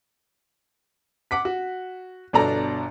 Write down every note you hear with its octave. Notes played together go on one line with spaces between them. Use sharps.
F#5 D6 B6
F#4
G1 B2 D4 A4 A#5